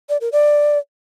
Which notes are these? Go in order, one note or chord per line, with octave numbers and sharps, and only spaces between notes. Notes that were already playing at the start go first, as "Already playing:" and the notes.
D5
A#4
D5